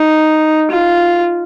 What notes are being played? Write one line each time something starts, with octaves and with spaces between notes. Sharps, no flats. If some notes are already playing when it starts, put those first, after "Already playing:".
Already playing: D#4
F4